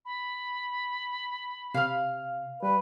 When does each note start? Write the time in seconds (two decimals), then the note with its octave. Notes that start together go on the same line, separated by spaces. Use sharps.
0.05 B5
1.74 C3 F5 F6
2.63 G3 B4